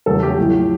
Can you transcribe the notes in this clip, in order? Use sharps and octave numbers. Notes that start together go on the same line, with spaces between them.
E2 C#3 F#3 A3 A4
G4
B1 A2 F3 A3